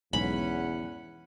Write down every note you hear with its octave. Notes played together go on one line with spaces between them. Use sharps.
B1 E2 G#2 C#4 F#5 G#5 B5